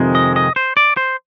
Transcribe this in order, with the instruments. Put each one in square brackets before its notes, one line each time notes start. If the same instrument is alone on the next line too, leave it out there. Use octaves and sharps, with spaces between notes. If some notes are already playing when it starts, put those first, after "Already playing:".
Already playing: [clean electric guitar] F2 C3 D#3 G#3
D#5
D#5
C5
D5
C5